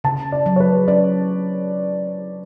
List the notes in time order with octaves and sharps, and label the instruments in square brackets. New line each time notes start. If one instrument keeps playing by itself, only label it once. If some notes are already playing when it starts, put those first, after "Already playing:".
[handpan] C#3 [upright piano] A5
[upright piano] D5
[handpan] F#3
[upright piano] C#5
B4
[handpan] C#4 [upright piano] D5